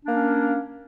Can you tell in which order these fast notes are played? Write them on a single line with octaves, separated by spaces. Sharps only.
D4 A#3 C#4